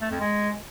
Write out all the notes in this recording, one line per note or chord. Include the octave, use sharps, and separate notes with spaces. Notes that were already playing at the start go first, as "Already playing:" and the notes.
A3
F2
G#3